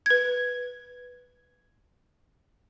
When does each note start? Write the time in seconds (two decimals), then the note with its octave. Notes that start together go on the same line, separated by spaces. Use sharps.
0.06 B4 G#6